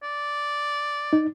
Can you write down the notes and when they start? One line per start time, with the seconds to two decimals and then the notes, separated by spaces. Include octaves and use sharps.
0.03 D5
1.13 D#4